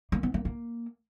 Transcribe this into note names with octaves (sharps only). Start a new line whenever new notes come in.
A#3
B3
A#3
A#3